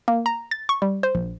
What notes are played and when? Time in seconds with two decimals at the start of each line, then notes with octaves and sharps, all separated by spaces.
0.08 A#3
0.26 A#5
0.51 A6
0.69 C#6
0.82 G3
1.03 C5
1.15 A#1